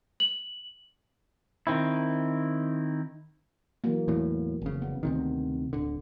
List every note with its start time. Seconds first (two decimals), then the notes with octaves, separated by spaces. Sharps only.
0.20 F#7
1.67 D#3 C4 E4
3.84 E3 F#3 A#3
4.08 E2 A2
4.62 F1 C#3
4.82 B3
5.03 D2 C3 D#3
5.73 D1 D3